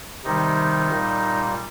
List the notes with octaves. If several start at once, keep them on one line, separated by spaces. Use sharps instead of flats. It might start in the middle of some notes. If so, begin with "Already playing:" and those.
C3 D#3 G3 D#4
A#2 G3